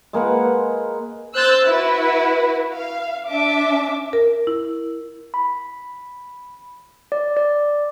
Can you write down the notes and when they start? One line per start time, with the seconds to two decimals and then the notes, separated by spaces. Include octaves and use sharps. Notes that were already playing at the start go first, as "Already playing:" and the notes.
0.13 G#3 A#3 B4 F#5
1.34 C5 E6 F#6 G6 A6
1.64 E4 F#4 B4
2.75 F5
3.28 D4 E5 D6
4.13 A#4
4.47 E4
5.34 B5
7.12 D5
7.37 D5